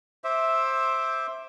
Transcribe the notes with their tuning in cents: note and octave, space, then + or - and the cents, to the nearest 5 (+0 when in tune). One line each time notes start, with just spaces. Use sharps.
C5 +15 E5 -5 D6 +5